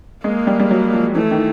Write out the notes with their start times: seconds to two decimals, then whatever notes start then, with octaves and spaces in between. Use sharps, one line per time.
0.24 G#3 A#3
0.47 G3
0.59 G3
0.71 F#3
0.93 F3
1.15 E3 A3
1.31 D#3